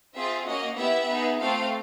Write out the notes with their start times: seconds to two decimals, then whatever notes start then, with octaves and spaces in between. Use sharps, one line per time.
0.14 C4 F4 G#4 E5
0.46 A#3 C#4 F#4 D#5
0.77 B3 E4 G4 E5
1.08 B3 D#4 G#4
1.39 A3 C4 F4 A4 F5